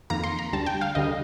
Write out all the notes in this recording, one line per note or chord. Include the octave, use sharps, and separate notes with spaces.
F2 D#3 A#3 A#5
C6
A#5
D2 D3 G3 A5
G5
F5
D2 D3 G3 D#5